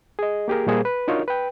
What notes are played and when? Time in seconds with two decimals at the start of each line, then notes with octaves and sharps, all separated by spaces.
0.19 G#4 D#5
0.48 A#3 G4 G#4 A#4
0.67 A#2 G3 A#3 G#4 C5
0.85 B4
1.08 D4 D#4 F4 F#4 A#4 C#5
1.28 B4 G5